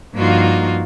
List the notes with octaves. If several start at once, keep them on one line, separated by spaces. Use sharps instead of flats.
G2 F3 A#3 D#4 F4 F#4